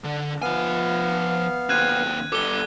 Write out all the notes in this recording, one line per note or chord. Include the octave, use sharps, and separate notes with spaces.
D3
F3 B3 F5 G#5
D#2 C4 F#6 G#6 D#7
G3 A4 D6 G7